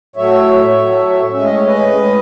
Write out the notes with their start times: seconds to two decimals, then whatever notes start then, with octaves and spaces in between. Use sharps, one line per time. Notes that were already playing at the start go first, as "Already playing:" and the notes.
0.16 A2 F#3 A3 C#5 E5
0.74 A2 F#3 A3
1.33 A2 G#3 C#4 E5
1.44 D#5
1.54 C#5
1.66 B4 D#5
1.91 A2 G#3 C#4